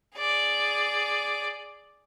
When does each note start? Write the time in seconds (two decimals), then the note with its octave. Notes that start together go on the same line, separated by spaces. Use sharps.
0.17 G#4 D5